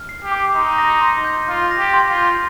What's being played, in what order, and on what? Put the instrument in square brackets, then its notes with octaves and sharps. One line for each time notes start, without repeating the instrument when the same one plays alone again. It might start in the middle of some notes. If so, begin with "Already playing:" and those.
Already playing: [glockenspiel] F6
C7
[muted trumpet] G4
[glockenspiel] D6
[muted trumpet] D#4 [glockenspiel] C6
[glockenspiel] A#6
C6
G6
[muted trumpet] F4 [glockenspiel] C6
[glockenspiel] A#6
[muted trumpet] G4
[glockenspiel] C6
[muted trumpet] F4
[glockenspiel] G6